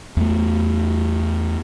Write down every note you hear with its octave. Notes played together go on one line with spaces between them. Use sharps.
E2 A3